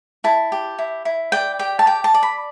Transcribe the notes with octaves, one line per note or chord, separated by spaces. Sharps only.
E4 A5
G4
E4
E4
D5 G5
G4 G5
A5
D5 G5
A5
D5
B5